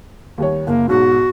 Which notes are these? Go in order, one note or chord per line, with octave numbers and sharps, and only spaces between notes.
D#2 G3 C#5
F#1 A#3
B1 G#2 F#4